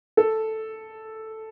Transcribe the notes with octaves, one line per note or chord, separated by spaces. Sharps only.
A4